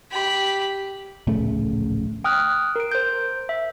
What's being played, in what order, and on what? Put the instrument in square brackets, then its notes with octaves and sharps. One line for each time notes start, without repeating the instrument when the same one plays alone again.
[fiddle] G4 B5
[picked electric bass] D1 A#1 C#3 A3
[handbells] G5 D#6 F6 F#6
A#4 D7
C5 G6
E5